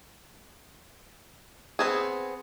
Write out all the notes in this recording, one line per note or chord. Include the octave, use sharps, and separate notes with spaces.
B3 C4 G#4